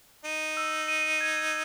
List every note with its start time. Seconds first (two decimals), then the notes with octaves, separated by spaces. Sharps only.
0.25 D#4 D#7
0.57 E6
0.88 D#7
1.21 G#6